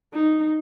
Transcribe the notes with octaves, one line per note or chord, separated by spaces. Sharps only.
D#4